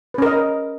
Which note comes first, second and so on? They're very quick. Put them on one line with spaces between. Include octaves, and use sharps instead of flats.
B4 C#4 A#4 D#5